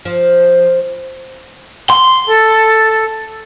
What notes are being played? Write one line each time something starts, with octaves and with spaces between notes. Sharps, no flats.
F3
C6
A4